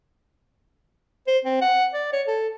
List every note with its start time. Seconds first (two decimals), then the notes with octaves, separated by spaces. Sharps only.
1.27 C5
1.45 C4
1.62 F#5
1.94 D5
2.13 C#5
2.28 A4